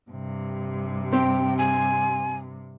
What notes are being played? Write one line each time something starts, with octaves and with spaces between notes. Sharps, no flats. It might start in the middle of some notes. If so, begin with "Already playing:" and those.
G2 C3
C4 G5
G#5